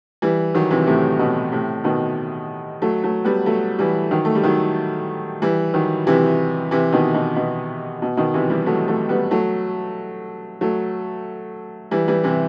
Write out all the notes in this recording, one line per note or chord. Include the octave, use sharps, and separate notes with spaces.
E3 G3
D#3 F#3
C3 E3
A2 C3
B2
A2 C3
B2 D#3
F#3 A3
F#3 A3
G3 B3
F#3 A3
E3 G3
D#3 F#3
A3
G3
D#3 F#3
E3 G3
D#3 F#3
C3 E3
C3 E3
B2 D#3
B2
B2
B2
B2 D#3
C3 E3
E3 G3
F#3 A3
F#3 A3
G3 B3
F#3 A3
F#3 A3
E3 G3
E3 G3
C3 E3